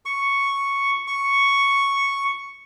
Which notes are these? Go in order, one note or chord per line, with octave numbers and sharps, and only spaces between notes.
C#6
C#6